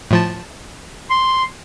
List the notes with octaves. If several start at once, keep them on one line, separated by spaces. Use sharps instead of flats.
A2 F3 A5
C6